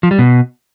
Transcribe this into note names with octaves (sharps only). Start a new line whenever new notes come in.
F3
G3
B2